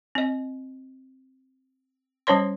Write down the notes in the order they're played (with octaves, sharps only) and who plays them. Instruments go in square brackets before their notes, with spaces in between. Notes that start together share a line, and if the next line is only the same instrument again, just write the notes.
[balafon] C4 D#5
G3 C#4 C5 C#5 C6